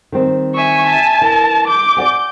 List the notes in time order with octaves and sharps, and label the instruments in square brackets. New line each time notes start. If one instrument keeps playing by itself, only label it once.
[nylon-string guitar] D#3 G3 C4
[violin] E5 G#5 [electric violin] C#6
[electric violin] A5
[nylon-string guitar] E3 [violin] A#4
[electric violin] D6 [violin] G6
[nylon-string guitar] D5 F#5 G#5